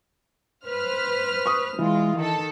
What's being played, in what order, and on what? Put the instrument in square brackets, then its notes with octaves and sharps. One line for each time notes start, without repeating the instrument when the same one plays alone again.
[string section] B4 C5 F6
[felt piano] C#6 D#6
[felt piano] E3 [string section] G#3 F4
[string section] D#3 A4